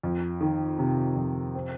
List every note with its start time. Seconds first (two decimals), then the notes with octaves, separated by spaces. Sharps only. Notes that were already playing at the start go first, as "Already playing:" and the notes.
0.03 F2
0.40 D#3
0.79 C3
1.16 F2
1.55 C4